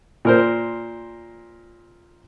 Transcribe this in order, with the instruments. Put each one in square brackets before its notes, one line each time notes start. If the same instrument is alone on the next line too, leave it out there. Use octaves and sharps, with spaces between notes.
[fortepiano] A#2 A#4 C5